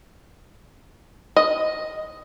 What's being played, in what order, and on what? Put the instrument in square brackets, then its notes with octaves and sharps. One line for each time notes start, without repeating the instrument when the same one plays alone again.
[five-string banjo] D#5